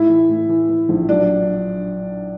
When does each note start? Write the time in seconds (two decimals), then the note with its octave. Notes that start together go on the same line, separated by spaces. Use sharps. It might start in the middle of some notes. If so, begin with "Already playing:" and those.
Already playing: A2 E4 E5
0.09 E3
0.29 A2
0.49 E3
0.69 E3
0.89 A#1
1.09 F#3 D4 D5